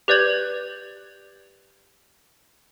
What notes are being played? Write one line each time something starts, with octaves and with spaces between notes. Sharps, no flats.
G4 B4 D5 G6 G#6 F#7